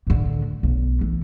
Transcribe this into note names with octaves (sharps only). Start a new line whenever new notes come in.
A2 D3
B1
E3